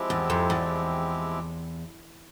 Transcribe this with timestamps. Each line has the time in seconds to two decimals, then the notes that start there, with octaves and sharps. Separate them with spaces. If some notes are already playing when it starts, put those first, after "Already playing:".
Already playing: F3 G#3 C4 E4 G4
0.10 E2
0.30 F2
0.50 E2